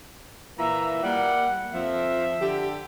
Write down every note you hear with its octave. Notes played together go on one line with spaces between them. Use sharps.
A#2 E3 E5 A#5
G3 A#3 F#5
F2 F3 E5
D3 G4